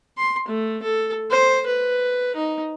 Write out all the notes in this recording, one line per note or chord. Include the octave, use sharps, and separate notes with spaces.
C6
A3
A4
C5
B4
D#4